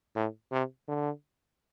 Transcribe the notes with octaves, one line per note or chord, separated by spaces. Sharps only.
A2
C3
D3